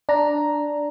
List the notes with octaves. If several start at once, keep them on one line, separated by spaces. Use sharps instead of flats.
D4 A#5